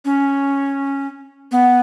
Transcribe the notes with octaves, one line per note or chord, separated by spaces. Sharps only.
C#4
B3